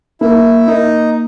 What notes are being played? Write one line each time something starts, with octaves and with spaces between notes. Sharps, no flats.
A#3 E4
A#3 D#4